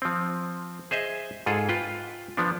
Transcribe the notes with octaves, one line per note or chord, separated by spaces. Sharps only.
F3 C4
G#4 C5 D#5 E5
G#2 F4 G#4 A4
F4 B4 G5
F3 B3 D4